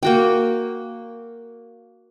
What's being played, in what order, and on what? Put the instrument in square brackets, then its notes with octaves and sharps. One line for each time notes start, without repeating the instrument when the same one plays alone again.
[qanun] A#3 F#4 G5